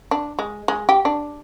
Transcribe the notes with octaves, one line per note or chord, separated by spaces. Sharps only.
D4
G#3
G#3
G4
D4